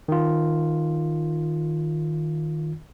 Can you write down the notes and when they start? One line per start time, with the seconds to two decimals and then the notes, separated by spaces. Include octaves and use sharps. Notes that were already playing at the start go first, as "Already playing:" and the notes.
0.08 D#3 F4